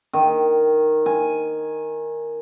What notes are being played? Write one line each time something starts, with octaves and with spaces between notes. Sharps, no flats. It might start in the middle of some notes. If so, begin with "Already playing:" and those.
D#3
G#5